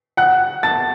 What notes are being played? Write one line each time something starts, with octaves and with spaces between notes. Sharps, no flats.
F#5 F#6
A5 A6